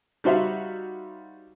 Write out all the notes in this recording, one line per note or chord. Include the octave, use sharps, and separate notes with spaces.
G3 D#4 F#4 C5 E5 F5